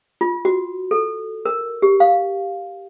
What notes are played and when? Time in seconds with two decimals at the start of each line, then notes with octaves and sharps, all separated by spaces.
0.21 F4
0.45 F#4
0.91 A4
1.45 A#4
1.82 G4
2.00 F5